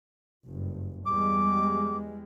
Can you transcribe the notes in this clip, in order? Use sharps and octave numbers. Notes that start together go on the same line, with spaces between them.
F#1 G2
E2 G3 G#3 D6